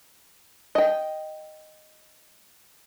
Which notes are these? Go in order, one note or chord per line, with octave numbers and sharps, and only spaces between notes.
D#5 G5